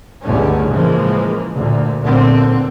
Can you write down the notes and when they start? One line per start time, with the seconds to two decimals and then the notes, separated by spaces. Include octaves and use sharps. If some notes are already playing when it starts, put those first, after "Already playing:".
0.23 G1 C#2 D3 A3 C#4
0.70 A2 C#3 E3 F3 G#3 A#3
1.54 D2 A#2
2.01 B1 A#2 D3 C4